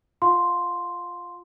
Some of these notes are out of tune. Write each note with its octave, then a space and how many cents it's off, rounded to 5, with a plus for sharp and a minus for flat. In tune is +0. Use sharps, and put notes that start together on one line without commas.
F4 -5 F5 +30 C6 +0